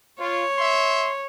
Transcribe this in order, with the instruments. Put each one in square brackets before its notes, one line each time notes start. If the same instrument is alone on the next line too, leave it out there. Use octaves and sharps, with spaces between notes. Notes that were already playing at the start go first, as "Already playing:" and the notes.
[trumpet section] F4 [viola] C#5
[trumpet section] E5 C6